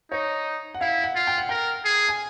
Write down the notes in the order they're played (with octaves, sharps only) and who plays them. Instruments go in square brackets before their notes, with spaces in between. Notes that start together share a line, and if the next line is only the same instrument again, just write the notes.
[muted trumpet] D#4 [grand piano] C#5
[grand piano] F#5
[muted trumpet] E4 [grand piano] F5
[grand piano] F#5
[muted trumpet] F4
[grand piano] G5
F#5
[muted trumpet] A#4 [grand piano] G5
[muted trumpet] G#4
[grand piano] G#5